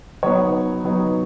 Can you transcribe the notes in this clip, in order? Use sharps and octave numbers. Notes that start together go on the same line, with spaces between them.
F#3 B3 D#4 C#5
F#3 B3 D#4